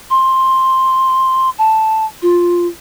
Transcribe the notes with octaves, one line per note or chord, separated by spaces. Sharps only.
C6
A5
F4